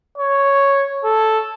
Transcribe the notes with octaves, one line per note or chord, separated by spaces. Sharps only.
C#5
A4